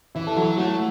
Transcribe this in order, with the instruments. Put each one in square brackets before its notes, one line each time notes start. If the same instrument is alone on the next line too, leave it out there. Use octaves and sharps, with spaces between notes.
[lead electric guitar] E3 [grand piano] E4
[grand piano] A4
[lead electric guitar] F#3 [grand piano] F#4
[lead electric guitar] A3 [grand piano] F#4